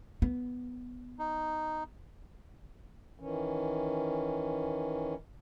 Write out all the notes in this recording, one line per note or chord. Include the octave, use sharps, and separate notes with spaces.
B3
D#4
D#3 E3 C#4